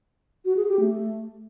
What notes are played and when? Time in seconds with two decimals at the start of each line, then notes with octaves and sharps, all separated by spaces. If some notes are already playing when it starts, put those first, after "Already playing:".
0.45 F#4
0.57 G#4
0.68 G4
0.80 A3